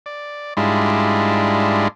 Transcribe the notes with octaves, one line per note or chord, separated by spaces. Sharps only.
D5
G#2 G3 G#3 D4 E4 F4